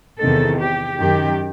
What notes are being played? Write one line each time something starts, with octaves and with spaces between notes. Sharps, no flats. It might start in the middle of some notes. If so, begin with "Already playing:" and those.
E2 C3 D#3 A4
G4
F#2 D#3 G4